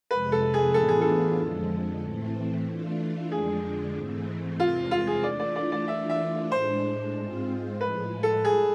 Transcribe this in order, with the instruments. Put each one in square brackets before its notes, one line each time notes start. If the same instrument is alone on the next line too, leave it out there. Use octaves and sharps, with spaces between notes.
[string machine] F2 C3 F3 G#3 [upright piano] B4
[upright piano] A4
G#4
[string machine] A2 E3 B3 D4 F4 [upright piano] A4
[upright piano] G#4
A4
[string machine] F2 D3 F3 G#3
A2 E3 A3 C4
E3 A3 D4 F4
[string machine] F2 D3 F3 G#3 D4 [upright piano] G#4
[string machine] G#2 E3 A3 C4
[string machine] E2 C3 G#3 C4 [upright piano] F4
[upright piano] F4
G#4
[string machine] E3 A3 D4 F4 [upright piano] D5
[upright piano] D5
D5
D5
[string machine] E3 A3 D4 F4 [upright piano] E5
[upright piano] E5
[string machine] A2 G#3 D4 [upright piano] C5
[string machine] G#2 G#3 C4 F4
[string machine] A2 F3 G#3 [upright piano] B4
[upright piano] A4
[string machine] G#3 [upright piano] G#4